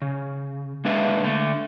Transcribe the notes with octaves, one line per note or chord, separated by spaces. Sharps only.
C#3
G#3 A#3 D4 B4 E5 F5
D3 A3